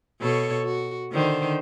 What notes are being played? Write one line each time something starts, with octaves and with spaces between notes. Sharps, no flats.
B2 A4 C#5
F#4
D3 D#3 C5